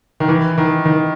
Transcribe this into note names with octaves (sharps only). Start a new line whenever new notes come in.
D#3
E3
D#3
D#3